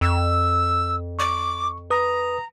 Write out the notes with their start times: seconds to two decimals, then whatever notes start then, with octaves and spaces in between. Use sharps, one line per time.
0.01 F2 E6
1.19 C#6 D6
1.90 B4 A#5 D#6